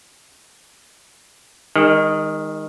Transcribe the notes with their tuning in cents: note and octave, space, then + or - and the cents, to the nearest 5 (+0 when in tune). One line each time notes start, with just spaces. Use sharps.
D#3 +0 G#3 -40